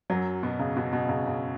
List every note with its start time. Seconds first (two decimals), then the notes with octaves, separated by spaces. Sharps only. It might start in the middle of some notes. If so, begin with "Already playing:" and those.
0.10 F#2 F#3
0.43 B2
0.59 C#3
0.76 B2
0.93 B2
1.09 C#3
1.27 C#3